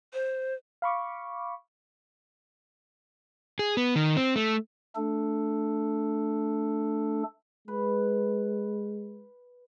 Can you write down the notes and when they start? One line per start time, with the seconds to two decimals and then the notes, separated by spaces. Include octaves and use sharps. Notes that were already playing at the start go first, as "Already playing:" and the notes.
0.13 C5
0.82 F5 B5 C#6 D6
3.59 G#4
3.77 B3
3.96 D#3
4.17 C4
4.36 A3
4.96 A3 D4 A4
7.68 G#3 B4